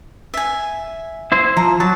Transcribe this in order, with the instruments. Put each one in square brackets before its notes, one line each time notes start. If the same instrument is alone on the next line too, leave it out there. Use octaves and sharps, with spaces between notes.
[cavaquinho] E5 G#5
[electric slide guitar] E4 C5
[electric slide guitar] F3 [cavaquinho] A#5
[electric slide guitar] F#3 [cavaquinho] A5